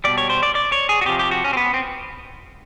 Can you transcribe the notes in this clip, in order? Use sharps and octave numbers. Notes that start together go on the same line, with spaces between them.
B2 G3 D5
C#5
C5
D5
D5
C#5
G#4
F#4
C3 F3 G4
G4
F#4
C#4
C4
B3
C4